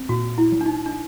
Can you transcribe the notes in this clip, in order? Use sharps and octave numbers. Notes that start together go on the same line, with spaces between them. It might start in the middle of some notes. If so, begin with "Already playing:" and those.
Already playing: C4
A#2 F#4
E4
F#3
D4
D#4
D4